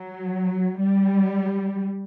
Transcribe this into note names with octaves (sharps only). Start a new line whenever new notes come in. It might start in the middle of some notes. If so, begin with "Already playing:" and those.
Already playing: F#3
G3